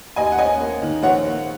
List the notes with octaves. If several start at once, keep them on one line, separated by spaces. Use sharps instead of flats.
D#2 D#5 G#5
F#5
C#4 D#5 G#5
A#3
D#3
A#1 C#5 F#5
A#3